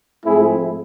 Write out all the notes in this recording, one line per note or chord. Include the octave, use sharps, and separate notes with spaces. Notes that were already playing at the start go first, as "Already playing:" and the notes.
G#2 F3 A3 C4 E4 G#4